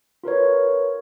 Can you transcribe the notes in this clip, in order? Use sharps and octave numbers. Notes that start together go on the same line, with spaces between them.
F4 A#4 B4 C#5